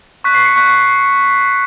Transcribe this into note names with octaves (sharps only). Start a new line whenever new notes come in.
C#6 F#6 B6
C7
C#7
C#6 F#6 B6